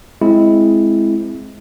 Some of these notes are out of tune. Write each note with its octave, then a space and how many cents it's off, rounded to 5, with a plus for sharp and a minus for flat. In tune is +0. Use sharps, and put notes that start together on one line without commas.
G#3 +10 C4 +0 E4 +0